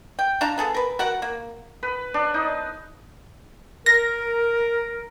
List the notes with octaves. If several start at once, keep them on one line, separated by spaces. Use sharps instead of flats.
G5
D4 F5 A5 A#5
B3 G#4 A4
A#4 B4
F#4 A#4 F#5
A#3
B4
D4
D#4
A#4 A#6